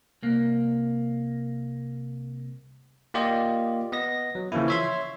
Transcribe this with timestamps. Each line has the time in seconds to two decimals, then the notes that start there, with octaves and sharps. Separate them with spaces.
0.23 C2 A#3
3.14 A#3 F4 G4 D5 D#5
3.92 B3 D#5 A#6
4.35 F#3
4.52 C#3 E3 F3 A#3 E4
4.68 C#5 E5 C6